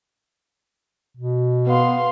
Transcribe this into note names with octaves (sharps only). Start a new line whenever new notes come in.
B2
B3 F5 C6